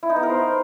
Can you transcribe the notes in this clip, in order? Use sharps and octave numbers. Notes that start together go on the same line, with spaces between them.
E4
D#4
B3
A#4
C5